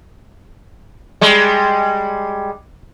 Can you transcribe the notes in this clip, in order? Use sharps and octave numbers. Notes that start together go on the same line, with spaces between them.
G3 G#3